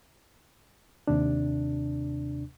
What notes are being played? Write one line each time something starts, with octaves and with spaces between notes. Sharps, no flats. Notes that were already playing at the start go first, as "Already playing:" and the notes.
D#2 C3 D4